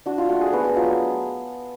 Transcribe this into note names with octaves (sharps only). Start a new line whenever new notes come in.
D4 F#4
F4
A3 F#4
G#4
B3 F#4
F#4
F#3 F4